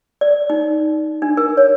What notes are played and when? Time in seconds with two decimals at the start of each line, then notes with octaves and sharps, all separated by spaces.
0.21 D5
0.50 D#4
1.22 D4
1.37 A#4
1.57 C#5